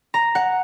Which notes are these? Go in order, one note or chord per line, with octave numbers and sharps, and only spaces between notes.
A#5
F#5